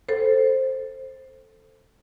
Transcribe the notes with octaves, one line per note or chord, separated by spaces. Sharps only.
A4 C5